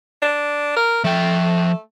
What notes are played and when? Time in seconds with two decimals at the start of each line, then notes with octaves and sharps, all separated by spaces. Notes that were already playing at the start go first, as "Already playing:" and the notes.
0.22 D4
0.76 A#4
1.04 F3 A3 G5